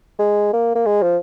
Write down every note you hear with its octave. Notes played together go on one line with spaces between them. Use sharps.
G#3
A#3
A#3
G#3
F3